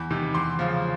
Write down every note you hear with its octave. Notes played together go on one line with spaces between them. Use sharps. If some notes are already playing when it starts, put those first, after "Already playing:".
Already playing: E2 B5
C3 D#3
E2 C6 D6
C#3 F3